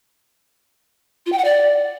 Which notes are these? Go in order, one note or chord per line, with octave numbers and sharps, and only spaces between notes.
F4
G5
F#5
D5